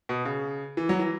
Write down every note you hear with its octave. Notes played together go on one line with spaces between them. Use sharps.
B2
C#3
E3
F#3
E3